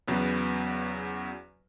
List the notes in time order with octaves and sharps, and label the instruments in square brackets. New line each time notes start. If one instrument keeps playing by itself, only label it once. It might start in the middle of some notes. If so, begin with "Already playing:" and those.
[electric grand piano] E2 C#3 F#3 B3